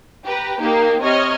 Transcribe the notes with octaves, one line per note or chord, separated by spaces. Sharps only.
G4 B4 A#5
A#3 D#4 G4
C3 C#5 D#5 C#6 F6